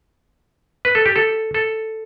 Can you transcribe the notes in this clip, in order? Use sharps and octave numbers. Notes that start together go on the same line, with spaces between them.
B4
A4
G4
A4
A4